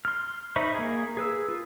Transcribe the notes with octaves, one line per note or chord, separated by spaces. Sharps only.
C6 F6
D#4 C5 E5 B5 C#6
A#3 G#4
G#4 B4 E6
F4